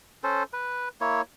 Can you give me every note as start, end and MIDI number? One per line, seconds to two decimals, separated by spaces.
0.23 0.43 61
0.23 0.43 69
0.23 0.43 72
0.53 0.89 71
1.01 1.22 58
1.01 1.22 64
1.01 1.22 73